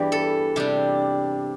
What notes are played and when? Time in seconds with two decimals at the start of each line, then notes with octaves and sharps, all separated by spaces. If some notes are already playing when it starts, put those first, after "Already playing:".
Already playing: E2 G2 E3 G3 D4
0.12 A4
0.56 C3 G3 D4